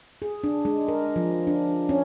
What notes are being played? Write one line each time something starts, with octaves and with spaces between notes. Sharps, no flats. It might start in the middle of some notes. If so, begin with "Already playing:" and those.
G#4
D4
G#3
A#4
F3
D4
C#4